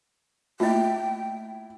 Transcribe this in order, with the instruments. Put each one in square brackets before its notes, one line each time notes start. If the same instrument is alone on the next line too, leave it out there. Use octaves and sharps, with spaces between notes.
[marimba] A3 A#3 [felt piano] E4 [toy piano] F4 D#5 [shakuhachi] G5